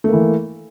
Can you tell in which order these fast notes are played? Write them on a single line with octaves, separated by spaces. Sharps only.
A3 A#3 E3